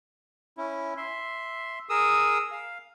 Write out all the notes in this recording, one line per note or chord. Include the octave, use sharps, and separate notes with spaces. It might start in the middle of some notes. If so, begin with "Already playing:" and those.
C#4 E4
E5 C6
G#4 A#4 D#6 E6
F5